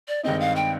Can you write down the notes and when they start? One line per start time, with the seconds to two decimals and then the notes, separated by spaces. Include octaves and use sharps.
0.08 D5
0.23 G2 D#3 G#3 C4 D#4 D#5
0.40 F5
0.56 G5